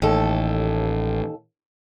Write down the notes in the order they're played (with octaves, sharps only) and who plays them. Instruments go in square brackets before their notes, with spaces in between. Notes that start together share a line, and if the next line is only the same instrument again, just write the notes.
[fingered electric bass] A1 [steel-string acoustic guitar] D#2 A4